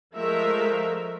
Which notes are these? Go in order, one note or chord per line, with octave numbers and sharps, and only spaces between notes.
F3 G#3 A3 A#4 E5